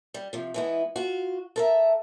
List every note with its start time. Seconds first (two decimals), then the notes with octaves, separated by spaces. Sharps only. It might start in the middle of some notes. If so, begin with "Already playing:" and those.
0.14 G3
0.33 C3 F3
0.54 E3 G#3 B3
0.96 F4 F#4
1.56 A4 A#4 E5